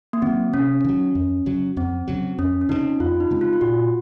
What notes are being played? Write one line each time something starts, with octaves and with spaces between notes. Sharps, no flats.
A#3
D#3 F#3 C4
C3 C#4
D#3 F#3
F2
C#3 F#3
F2 C4
C#3 F#3
F2 C#4
C#4
C#3 G#3 C4 D#4
F2 F4
D#4
C#3 G#3 C4
F4
F4
A#2 F#4